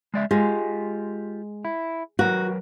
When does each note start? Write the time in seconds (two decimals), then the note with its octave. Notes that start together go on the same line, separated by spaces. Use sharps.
0.14 G#3 D5 E5
0.31 G#3 F4 G4
1.65 E4
2.19 F#3 F#4 A#4 B4